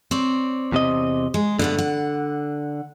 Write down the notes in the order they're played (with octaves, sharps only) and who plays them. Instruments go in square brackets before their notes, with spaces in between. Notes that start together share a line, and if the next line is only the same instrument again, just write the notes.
[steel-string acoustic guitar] C4 C#5 D5
[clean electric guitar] E2 C3 D#5
[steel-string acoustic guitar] G#3
[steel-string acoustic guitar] G2 A3 B3 [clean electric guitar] D3
[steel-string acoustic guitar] F#5